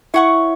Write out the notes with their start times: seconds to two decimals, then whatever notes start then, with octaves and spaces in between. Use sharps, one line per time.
0.14 E4 C#5 E5 F#5 C#6